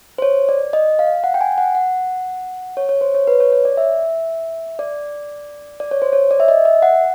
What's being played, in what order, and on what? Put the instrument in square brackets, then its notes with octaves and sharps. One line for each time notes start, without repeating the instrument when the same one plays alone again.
[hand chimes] C5
C#5
D5
D#5
F5
F#5
G5
G#5
F#5
F#5
C#5
C#5
C5
C#5
B4
C#5
C#5
D5
E5
D5
D5
C#5
C5
C#5
D5
E5
D#5
E5
F#5